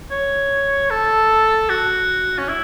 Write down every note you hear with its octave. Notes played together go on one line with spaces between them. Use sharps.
C#5
A4
F#4
C#4
E4